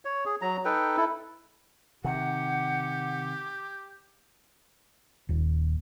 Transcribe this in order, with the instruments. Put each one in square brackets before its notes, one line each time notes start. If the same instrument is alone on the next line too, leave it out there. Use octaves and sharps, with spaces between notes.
[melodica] C#5
G#4
F#3 A#5
D#4 A4 B4 G5
E4 A4
[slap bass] C3 D#3 [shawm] G4 [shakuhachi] F#5
[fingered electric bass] D#1